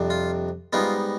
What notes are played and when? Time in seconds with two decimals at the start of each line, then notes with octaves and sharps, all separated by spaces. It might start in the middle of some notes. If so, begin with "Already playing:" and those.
Already playing: F2 C3 G3 D4
0.10 F4
0.73 G#2 G3 B3 D#4 F4